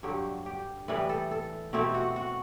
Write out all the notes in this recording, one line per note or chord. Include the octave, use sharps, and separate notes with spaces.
G2 D3 F#3 G4
G4
A2 E3 G3 B4
A4
A4
B2 A3 C4 E4 G4
F#4
F#4